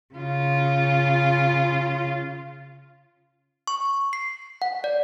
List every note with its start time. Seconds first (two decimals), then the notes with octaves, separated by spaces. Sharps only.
0.15 C#3 F4
3.67 C#6
4.13 C7
4.62 F#5
4.84 D5